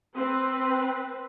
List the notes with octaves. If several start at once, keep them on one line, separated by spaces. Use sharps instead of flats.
C4 B4